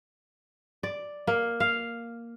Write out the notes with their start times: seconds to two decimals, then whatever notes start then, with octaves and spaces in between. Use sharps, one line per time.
0.83 D5
1.27 A#3
1.60 F5